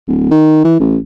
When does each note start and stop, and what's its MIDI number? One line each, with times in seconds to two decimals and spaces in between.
0.08 0.29 26
0.31 0.63 51
0.64 0.78 52
0.80 0.97 33